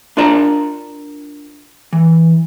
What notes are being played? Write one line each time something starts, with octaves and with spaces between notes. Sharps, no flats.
D4 F4 A#4 D5 A5 A#5
E3